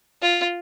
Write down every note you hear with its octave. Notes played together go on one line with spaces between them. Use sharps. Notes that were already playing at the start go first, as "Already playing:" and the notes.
F4